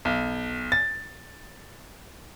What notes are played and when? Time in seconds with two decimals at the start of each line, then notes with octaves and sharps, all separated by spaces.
0.05 B1
0.72 A6